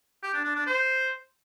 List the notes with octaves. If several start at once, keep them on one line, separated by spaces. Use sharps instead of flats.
G4
D4
D4
D4
C5